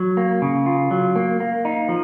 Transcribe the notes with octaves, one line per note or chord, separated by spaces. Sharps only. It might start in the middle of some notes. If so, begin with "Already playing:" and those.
Already playing: F#3
A#3
C#3
F4
F#3
A#3
A#3
D#4
F3